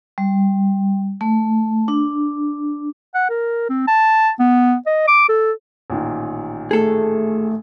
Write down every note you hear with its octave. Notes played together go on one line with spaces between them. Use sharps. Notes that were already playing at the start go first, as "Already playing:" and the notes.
G3
A3
D4
F#5
A#4
C4
A5
B3
D#5
D6
A4
A1 A#2 D#3
A3 G#4 A4